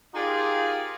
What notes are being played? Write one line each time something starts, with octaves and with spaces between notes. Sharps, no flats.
D#4 F4 G4 G#4 A#4 D5